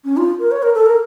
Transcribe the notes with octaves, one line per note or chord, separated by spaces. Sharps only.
C#4
F4
A#4
C#5
A#4
A4
A#4